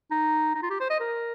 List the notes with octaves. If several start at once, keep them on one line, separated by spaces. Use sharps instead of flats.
D#4
D#4
F4
G4
C5
D#5
A#4